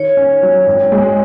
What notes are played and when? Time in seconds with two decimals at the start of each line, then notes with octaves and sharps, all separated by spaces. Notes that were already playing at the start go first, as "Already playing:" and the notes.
Already playing: D#3 C#5
0.17 C#4
0.43 F#3
0.66 G#1
0.92 G#3